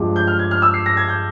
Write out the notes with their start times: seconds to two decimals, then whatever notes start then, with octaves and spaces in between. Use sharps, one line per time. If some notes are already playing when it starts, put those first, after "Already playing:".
Already playing: G2 F3 G#3
0.16 G6
0.27 F6
0.39 G#6
0.51 F6
0.62 E6
0.74 C7
0.86 A#6
0.97 G#6
1.08 G6